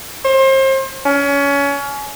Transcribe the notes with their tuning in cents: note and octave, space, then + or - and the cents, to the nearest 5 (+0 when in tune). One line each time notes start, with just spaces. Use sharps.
C5 +35
C#4 +25